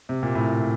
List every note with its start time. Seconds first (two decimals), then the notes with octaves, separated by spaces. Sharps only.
0.09 C3
0.23 A#2
0.35 A2